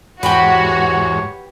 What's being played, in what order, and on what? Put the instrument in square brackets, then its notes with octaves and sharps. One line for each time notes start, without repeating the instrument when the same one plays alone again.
[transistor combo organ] E2 G#2 [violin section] F#4 [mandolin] G4 B4 B5 [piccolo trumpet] C#5